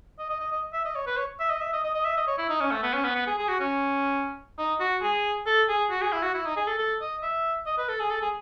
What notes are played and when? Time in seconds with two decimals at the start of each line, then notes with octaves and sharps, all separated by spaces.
0.18 D#5
0.30 D#5
0.40 D#5
0.52 D#5
0.73 E5
0.85 D#5
0.95 C#5
1.07 B4
1.17 C#5
1.40 E5
1.50 D#5
1.61 E5
1.73 D#5
1.84 D#5
1.94 D#5
2.05 E5
2.17 D#5
2.27 C#5
2.38 E4
2.50 D#4
2.60 C#4
2.71 A3
2.83 B3
2.94 C#4
3.04 B3
3.15 B3
3.27 G#4
3.38 G#4
3.49 F#4
3.60 C#4
4.59 D#4
4.80 F#4
5.02 G#4
5.46 A4
5.69 G#4
5.91 F#4
6.02 G#4
6.13 E4
6.23 F#4
6.35 E4
6.46 D#4
6.57 G#4
6.67 A4
6.78 A4
7.01 D#5
7.23 E5
7.66 D#5
7.78 B4
7.89 A4
8.00 G#4
8.10 A4
8.22 G#4